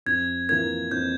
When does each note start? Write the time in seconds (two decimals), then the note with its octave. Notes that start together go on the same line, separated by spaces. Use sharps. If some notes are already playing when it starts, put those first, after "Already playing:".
0.06 F2 G#6
0.49 E3 A#3 F4 A#4 G#6
0.91 F2 G6